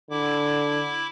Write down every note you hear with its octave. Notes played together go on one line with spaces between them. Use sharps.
D3 E4 D6